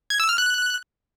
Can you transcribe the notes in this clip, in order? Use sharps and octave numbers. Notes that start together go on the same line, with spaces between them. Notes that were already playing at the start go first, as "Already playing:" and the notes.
G#6
E6
F6
F#6